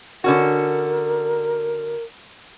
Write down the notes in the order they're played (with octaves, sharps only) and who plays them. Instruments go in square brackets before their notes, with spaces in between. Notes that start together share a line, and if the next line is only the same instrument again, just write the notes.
[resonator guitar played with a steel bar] D3 C#4 F#4 [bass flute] A#4